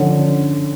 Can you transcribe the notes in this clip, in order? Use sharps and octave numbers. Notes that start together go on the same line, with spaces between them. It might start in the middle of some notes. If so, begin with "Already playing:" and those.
Already playing: D3 F3 C#4